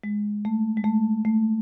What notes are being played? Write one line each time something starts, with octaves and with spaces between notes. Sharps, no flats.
G#3
A3
G#3
A3
A3